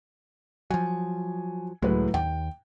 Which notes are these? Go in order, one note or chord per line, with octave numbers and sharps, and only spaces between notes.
F3 F#3 G#5
C#2 A2 F#3 G#3 B4
D#2 G5